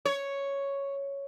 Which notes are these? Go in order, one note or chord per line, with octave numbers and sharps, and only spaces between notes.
C#5